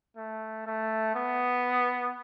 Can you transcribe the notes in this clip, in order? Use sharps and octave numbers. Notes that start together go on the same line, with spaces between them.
A3
A3
B3